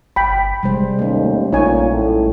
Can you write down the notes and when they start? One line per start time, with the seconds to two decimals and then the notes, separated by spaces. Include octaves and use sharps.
0.16 G1 G5 B5
0.63 C3 G3 G#3 C5
0.99 D#2 A3 C#4
1.53 A#1 A#2 D#4 C#5 G#5
1.91 A2